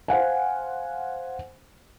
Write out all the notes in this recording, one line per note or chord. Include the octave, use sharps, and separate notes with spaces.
C5 F5 F#5 G#5